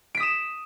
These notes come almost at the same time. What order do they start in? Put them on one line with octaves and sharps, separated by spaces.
D7 B6 D#6 E7